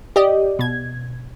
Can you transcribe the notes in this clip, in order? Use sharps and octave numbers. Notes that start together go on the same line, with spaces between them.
G4 D5 D#5
B2 G#6